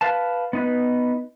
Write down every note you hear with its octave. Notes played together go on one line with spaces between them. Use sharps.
B4 F5 A5
B3 D#4 B4